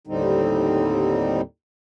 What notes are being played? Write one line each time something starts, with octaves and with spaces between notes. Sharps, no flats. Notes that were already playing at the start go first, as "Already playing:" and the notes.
D#2 A2 D3 G3 C4 D#4